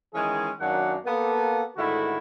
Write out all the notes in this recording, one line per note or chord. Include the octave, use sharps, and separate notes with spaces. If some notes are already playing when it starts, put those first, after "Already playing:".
D#3 E3 G#3 C#4 G#4
F#2 D#3 F#3 A#3 D4 F#5
A#3 B3 A4
G#2 D3 D#3 A3 E4 F#4